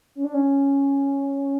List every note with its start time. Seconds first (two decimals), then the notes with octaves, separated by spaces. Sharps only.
0.15 C#4
0.24 D4
0.34 C#4